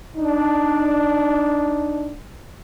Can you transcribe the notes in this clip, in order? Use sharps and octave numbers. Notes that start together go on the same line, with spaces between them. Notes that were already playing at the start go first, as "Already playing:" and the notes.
D4 D#4